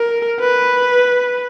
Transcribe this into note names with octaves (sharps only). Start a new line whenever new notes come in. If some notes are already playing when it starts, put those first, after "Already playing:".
Already playing: A#4
B4